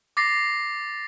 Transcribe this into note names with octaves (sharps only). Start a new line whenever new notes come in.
D6 A6 A#6 C7